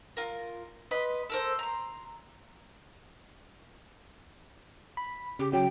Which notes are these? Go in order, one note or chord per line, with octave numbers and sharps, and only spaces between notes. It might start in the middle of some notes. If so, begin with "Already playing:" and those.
F4 A#4
B4 D#5 B5 C6
A4 A#4 C5
A#5 C6
B5
C#3 G4
C#3 F#3 G5